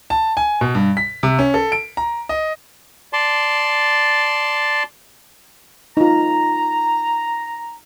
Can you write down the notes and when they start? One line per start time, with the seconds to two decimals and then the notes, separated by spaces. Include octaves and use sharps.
0.10 A5
0.37 G#5
0.61 B2
0.75 G2
0.97 B6
1.23 C3
1.39 C#4
1.54 A4
1.72 D7
1.97 A#5
2.29 D#5
3.13 D5 A5 C6
5.97 D#4 F4 A#5